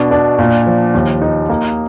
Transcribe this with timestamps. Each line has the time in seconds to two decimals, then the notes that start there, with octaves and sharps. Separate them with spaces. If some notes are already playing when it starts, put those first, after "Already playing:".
Already playing: B2 D4
0.11 D4
0.39 A#2
0.67 F3
0.94 D#2
1.22 D#4
1.49 A#3